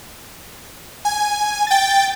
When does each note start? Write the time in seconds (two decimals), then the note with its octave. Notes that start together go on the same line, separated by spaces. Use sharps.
1.05 G#5
1.67 G5 A6